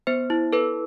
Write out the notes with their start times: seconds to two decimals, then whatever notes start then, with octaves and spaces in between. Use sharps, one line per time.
0.07 B3 C5
0.30 E4
0.53 A4 B4